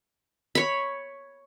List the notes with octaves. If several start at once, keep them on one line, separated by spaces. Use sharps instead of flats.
C#5 B5